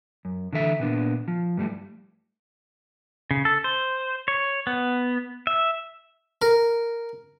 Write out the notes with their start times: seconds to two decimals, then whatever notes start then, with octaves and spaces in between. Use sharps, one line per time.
0.25 F#2
0.53 D3 E3 A4 E5
0.80 A#2 B3 D4
1.28 F3
1.57 G2 G3 A3
3.31 C#3
3.45 A4
3.64 C5
4.28 C#5
4.67 B3
5.47 E5
6.42 A#4